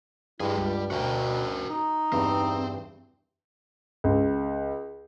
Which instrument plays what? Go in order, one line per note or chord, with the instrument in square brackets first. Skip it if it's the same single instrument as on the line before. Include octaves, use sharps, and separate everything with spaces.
[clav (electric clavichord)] G2 [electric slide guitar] G3 G#4 [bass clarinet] E4
[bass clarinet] C#2 [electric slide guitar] G3
[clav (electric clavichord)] D2 [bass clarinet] B2 [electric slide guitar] F#4 A#4 G5
[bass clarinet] D#4
[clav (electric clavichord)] E2 G2 [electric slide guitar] C4
[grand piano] C#2